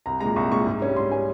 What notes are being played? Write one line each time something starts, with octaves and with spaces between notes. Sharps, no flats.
C2 A#5
A#2 G#3 A#5
C2 C#6
A#2 G#3 C#6
G#2
G3 C#4
G#2 C6
G3 C#4 G#5